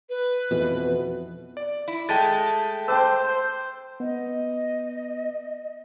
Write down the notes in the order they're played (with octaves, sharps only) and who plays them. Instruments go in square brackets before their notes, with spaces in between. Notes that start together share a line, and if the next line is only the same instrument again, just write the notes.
[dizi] B4
[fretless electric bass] F2 B2 E3
[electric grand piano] D5
[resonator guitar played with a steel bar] E4
[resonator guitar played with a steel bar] G#3 A3 [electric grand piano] G5 A5 A6
[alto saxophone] C5 [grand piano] G5 A5 D6 [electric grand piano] E6
[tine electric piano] B3 [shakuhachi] D#5